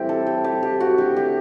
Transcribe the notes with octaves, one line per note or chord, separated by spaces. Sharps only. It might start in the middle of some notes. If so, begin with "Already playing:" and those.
Already playing: A2 E3 G3 C4 E4 G4
A4
G4
G4
G4
F#4
D3 A3 G4
G4